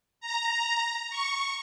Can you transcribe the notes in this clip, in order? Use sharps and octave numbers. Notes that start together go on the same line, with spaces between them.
A#5
C#6